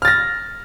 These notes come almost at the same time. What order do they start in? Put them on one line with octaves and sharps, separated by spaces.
F6 A6 A#6